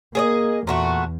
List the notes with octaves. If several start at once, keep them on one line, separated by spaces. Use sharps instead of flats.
A#3 G#4 C#5 D#5
E2 A#2 A3 F#4